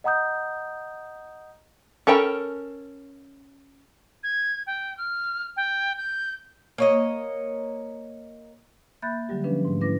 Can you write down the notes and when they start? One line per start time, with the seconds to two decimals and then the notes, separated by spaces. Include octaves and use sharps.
0.04 D#5 F#5 A#5 D#6 G6
2.07 C#4 A4 A#4 G5 B5
4.23 G#6
4.67 G5
4.97 F6
5.57 G5
5.98 G6
6.78 A#3 C#5 D#5
9.02 A#3 E5 B5 F#6 G6 A6
9.29 D3 F#3 G3 G4
9.44 F3 C#4 D4 B4
9.65 G#2 A3
9.81 C#4 E4 B4 D6 A#6